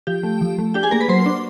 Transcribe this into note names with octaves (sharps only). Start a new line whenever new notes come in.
F3 G4 G5
A3
F3
A3
D4 G4 G5
G#4 G#5
A#3 A#4 A#5
B4 B5
F#3 C5 C6
D4